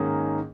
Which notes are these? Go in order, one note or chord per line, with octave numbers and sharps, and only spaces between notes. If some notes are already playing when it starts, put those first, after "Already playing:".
Already playing: G#2 D#3 A#3 C#4 G#4